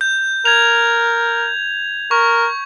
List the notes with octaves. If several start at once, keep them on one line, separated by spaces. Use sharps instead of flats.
G6
A#4 G#6 F7
A#4 C#6